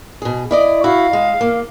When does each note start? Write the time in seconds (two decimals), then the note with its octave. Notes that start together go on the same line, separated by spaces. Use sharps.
0.22 B2 G#4
0.51 E4 D5 D#5
0.84 E4 F#4 F5
1.13 G#3
1.41 A#3